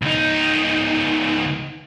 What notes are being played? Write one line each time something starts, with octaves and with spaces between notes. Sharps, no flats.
C#2 D#4